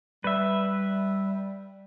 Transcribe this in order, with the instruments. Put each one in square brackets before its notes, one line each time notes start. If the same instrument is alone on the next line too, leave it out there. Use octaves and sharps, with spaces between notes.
[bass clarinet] G3 [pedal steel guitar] B4 E5